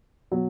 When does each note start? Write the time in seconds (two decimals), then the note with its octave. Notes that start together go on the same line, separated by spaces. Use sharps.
0.32 B2 F#3